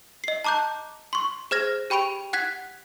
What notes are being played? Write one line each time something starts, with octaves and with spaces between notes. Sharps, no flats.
D#5 C7
A5 A#5 D6 F#6 G6
C6 C#6
G#4 C5 F6 G#6 A#6
G4 G5 B5 C#6 D7 F7
F#5 F#6 G#6 B6